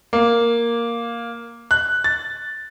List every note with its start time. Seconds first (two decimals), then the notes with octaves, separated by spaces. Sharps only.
0.13 A#3
1.71 F#6
2.04 A6